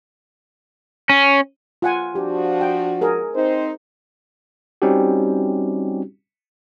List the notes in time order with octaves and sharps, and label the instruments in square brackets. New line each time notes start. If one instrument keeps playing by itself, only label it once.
[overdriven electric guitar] C#4
[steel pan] F4 F#5 G#5
[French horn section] F3 D4 F#4 [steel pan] G4
[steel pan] G5
G#4 A#4
[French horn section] C4 D#4 C5
[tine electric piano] G3 C4 C#4 D#4 F#4 G4